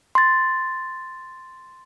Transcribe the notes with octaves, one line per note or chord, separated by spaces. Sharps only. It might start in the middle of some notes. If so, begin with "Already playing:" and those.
C6 A6